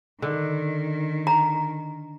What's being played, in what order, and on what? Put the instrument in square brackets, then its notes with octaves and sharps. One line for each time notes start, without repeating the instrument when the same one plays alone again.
[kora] D3 [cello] D#3
[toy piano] A#5